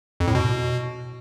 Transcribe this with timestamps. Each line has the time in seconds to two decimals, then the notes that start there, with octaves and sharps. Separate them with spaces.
0.20 F2
0.28 A2
0.35 B2